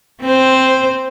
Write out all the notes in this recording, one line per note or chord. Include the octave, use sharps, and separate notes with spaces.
C4 C5